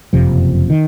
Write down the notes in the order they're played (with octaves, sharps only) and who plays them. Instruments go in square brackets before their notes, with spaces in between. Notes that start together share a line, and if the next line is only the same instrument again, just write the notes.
[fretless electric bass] F#1 F2 C3 F3
D#3